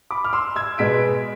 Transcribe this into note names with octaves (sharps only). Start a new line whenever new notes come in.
B5 D6
F6
C6 E6
E6 G#6
B2 G#3 B3 B6 D7